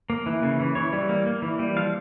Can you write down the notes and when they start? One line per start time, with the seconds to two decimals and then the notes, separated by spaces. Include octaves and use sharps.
0.10 A#3
0.26 E3
0.43 C#3
0.60 E3
0.75 E3 C#5
0.93 G3
1.09 A#3
1.26 A#3
1.42 E3
1.59 G3
1.76 F3 F5